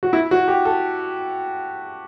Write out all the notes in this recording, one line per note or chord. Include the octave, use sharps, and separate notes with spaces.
F#4
E4
F#4
G4
A4